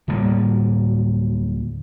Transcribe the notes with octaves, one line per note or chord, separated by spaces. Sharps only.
D1 A2 G3 A#3